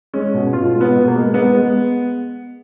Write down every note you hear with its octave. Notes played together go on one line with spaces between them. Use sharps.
G#3 C#4
B2
B2 F4
G#3
B3
B2
A#3
G#3
G#3 B3
G#3